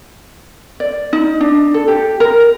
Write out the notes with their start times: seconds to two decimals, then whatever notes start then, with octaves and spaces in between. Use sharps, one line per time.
0.80 D5
1.13 D#4
1.41 D4
1.74 A4
1.88 G4
2.20 A#4